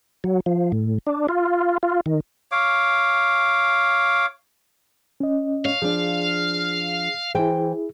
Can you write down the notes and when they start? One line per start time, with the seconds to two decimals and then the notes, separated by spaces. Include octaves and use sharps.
0.24 F#3
0.46 F3
0.72 A2
1.07 D4
1.29 F4
1.83 F4
2.06 D#3
2.52 C#5 F5 D6
5.20 C#4 D#5
5.65 C#5 F5
5.82 F3 D4 G#4
7.35 E3 E4 G#4 C5 G5